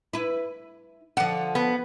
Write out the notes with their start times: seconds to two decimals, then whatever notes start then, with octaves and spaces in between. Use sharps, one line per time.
0.13 E4 B4
1.17 D3 F3 F#5
1.55 B3